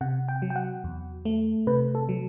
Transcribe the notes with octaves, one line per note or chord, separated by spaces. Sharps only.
C3 F#5
G5
F#3
G5
F#5
E2
A3
C3 B4
A4
F#3